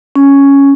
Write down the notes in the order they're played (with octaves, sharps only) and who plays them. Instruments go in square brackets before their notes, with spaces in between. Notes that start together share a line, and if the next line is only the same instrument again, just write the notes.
[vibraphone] C#4